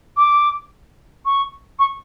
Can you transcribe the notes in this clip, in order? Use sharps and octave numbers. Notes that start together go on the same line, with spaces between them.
D6
C#6
C#6